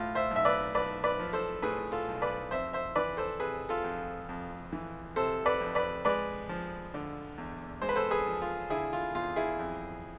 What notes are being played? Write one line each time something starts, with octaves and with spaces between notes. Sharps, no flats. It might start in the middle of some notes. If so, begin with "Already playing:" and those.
Already playing: A2 F4
C5 E5
B1
E5
B4 D5
B1 B4 D5
B4 D5
F3
A4 C5
A2 G#4 B4
F4 A4
B1
B4 D5
F2 C5 E5
C5 E5
E3 B4 D5
A4 C5
C3 G#4 B4
F4 A4
F2
F2
E3
C3 A4 C5
B4 D5
F2
B4 D5
G#3 B4 D5
F3
D3
E2
G#3 C5
B4
A4 C5
G#4 B4
F3
F4
D3 E4 G#4
F4
E2 F4
E4 G#4
F2